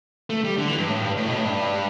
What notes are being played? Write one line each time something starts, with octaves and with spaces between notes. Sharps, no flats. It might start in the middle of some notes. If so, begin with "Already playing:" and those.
A3
G3
D3
E3
G2
A2
G2
A2
B2
A2
G2